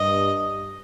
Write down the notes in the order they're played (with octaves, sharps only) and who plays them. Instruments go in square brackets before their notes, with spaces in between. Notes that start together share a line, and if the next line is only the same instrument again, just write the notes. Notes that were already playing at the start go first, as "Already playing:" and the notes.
Already playing: [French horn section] G2 [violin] D#5